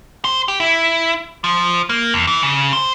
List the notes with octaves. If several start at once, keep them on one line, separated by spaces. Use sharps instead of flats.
C5
G4
E4
F3
A#3
E2
E3
C#3
C5